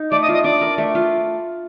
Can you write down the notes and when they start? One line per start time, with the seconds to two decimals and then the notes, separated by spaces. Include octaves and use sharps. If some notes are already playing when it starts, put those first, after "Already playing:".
Already playing: D#4
0.12 A3 D5 D6
0.22 D#5 D#6
0.28 F4
0.34 D#5 D#6
0.44 D4 D5 D6
0.61 A#4
0.78 A3
0.95 F4